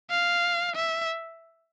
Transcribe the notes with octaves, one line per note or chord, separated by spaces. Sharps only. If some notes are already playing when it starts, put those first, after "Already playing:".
F5
E5